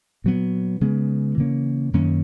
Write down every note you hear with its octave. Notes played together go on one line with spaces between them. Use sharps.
A#2 F#3 B3
C#3 G#3 B3
C#3 E3 A#3 C#4
F#2 D#3 A#3 C#4